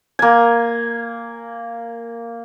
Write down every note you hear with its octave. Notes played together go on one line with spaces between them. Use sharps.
A#3 G#5